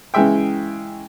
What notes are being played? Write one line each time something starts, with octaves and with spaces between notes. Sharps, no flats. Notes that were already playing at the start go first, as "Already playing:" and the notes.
C#3 E3 G#3 G#4 E5 G5